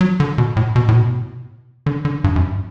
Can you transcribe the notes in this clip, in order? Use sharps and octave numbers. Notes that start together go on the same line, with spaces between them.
F#3
D3
B2
A2
B2
A2
B2
D3
D3
G2
F#2